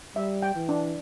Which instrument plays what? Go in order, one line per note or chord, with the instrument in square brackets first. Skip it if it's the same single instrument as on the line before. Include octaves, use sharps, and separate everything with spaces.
[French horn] G3 [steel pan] E5
[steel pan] G5
[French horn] E3
[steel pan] D4